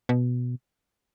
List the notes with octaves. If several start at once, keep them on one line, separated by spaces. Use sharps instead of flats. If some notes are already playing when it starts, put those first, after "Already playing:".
B2